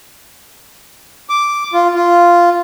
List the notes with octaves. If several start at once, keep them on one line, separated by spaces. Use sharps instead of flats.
D6
F4
F4